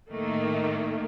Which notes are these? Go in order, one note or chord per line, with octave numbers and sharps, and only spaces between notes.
A2 D#3 A3 A#3